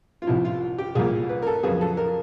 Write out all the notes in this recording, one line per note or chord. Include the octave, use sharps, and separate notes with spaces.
F4
C2 C3 F3 E4
F4
G4
C2 A#2 G3 A#3 G#4
B4
A#4
A4
F2 C#3 F#3 B3 G#4
A4
A#4